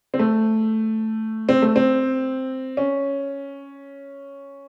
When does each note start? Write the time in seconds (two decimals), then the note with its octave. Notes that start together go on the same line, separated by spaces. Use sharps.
0.14 C4
0.19 A3
1.49 C4
1.62 A3
1.76 C4
2.77 C#4